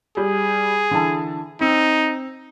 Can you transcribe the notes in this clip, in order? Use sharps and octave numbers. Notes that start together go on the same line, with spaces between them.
G3 G#4
D3 E3 A5
C4 D#4